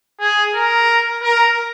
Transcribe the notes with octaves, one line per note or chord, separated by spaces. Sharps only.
G#4
A#4
A#4